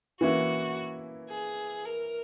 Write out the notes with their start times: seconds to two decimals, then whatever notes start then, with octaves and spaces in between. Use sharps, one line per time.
0.21 E3 A#3 C#4 E4 F#4
1.31 G#4
1.85 A#4